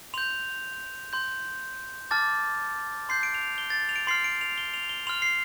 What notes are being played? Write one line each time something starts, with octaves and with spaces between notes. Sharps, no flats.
C6 G6 F7
C6 G6
A5 D6 F6 A6
C6 G6 C7
D7
F7
G7
A6
F7
D7
C6 F6 C7
D7
F7
G7
F7
G7
C6 F6 F7
C7